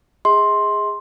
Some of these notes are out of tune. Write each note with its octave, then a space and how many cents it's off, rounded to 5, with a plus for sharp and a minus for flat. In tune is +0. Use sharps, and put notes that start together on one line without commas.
G#4 -15 D#5 +45 C6 +10